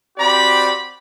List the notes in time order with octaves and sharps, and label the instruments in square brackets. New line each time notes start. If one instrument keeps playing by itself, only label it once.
[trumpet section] C4 F#4 G4 D5 B5